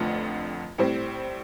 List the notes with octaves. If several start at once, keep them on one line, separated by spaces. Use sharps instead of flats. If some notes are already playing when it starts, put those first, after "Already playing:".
Already playing: F1 F2 D3 F3 A3
A2 G3 C4